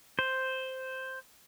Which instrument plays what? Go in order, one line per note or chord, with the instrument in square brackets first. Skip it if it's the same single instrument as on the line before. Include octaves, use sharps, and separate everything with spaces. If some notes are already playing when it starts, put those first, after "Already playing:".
[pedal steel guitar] C5